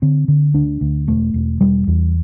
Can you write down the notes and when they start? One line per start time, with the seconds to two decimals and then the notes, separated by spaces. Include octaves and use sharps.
0.02 D3 C4
0.28 D3
0.54 D2 D4
0.81 D2
1.08 E1 A3
1.34 E1
1.61 E1 G3
1.87 E2